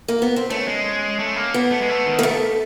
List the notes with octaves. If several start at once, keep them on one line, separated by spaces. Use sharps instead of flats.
A#3
B3
C4
A3 C#4
G#3
A3
A#3
B3
A3
G#3
A3
D#3
A#3
A3